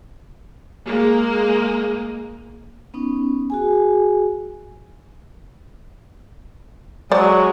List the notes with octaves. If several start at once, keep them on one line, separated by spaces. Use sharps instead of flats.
G#3 A#3
B3 C#4 D#4
F#4 G#4 G#5
F#3 G#3 C5 D5